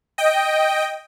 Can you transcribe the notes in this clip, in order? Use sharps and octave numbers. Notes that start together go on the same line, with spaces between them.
D#5 G5